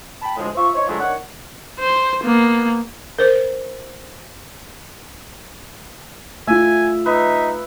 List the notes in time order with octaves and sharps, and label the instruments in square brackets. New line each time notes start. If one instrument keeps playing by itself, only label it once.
[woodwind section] G5 A5 B5
D2 A2 F3 G#3
F4 C5 E5 C#6
D#4 C5 C#5
D3 F3 F#3 G#3 A3
D#3 D4 C#5 F#5
[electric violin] C5
A#3 B3
[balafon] A#4 C5
[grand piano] A3 F4 [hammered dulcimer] E5 [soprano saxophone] G#5
[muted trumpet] D#4 [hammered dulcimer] B4 [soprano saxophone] E5